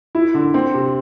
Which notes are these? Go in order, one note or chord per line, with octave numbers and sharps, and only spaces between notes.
E4
D3
C4
C3